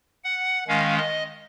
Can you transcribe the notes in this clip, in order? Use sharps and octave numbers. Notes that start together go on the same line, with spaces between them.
F#5
D#3 G#3 C#4 F5
D#5